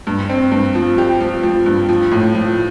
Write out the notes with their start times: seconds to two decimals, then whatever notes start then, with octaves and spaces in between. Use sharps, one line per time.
0.07 G2
0.29 C4
0.52 G2
0.75 F3
0.98 G4
1.21 F3
1.43 F3
1.66 G2
1.89 F3
2.11 A2
2.35 F3